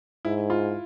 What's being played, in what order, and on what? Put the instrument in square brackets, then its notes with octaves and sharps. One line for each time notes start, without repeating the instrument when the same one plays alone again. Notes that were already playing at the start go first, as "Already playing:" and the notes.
[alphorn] G#2 [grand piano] E4
[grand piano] F4